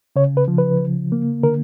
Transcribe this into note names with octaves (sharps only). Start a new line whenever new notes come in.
C#3 C#5
B4
F3
B4
C#3
A#3
D3 A#4